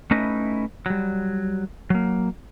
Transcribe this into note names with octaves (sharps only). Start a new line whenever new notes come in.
A3 C#4 D#4 E4 B4 D#5
F#3 G3
F#3 A#3